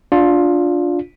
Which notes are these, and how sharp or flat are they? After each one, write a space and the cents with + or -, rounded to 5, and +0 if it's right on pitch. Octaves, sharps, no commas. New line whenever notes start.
D4 -10 F4 +15